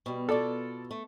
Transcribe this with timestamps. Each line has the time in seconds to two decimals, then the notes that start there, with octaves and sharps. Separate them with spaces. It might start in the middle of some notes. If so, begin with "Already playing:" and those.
0.06 B2 G3
0.29 B2 F4 A4 D5
0.91 A3